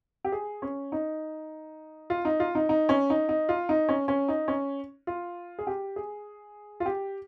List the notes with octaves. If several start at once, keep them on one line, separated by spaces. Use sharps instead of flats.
G4
G#4
C#4
D#4
F4
D#4
F4
D#4
D#4
C#4
D#4
D#4
F4
D#4
C#4
C#4
D#4
C#4
F4
G#4
G4
G#4
F4
G4